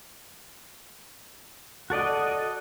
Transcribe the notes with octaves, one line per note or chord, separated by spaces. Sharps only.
F#4 A4 D5 D#5